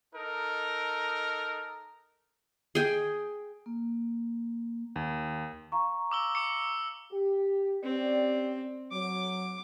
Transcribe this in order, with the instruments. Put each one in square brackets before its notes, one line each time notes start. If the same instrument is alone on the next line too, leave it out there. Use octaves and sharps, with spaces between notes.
[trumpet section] D#4 A4 A#4
[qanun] G#4 G5
[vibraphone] A#3
[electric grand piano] D#2
[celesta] F5 A#5 C#6
[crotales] D6 E6 G7
D6 C#7
[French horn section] G4
[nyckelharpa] C4 [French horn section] C#4 G4 D5
[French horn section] F#3 [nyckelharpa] D6